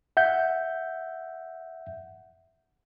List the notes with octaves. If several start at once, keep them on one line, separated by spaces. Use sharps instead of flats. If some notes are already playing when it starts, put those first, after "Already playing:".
E5 F#5 G6